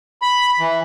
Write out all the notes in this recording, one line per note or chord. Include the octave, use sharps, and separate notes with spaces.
B5
E3